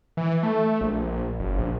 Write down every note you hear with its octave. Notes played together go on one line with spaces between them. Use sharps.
E3
A3
A#1
F#1
A#1